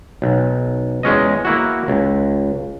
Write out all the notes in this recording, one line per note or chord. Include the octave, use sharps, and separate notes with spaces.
B1
E2 G#3 C#4 D#5
A#3 E4 F#4
C#2